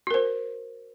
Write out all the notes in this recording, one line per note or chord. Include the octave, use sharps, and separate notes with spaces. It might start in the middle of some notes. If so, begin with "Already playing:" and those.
F#4 A#4 C5